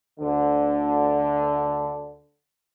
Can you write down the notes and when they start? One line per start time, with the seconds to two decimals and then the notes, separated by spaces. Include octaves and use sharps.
0.20 D2 D3